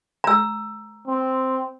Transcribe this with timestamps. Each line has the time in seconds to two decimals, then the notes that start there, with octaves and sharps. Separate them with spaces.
0.24 A#5 E6
1.08 C4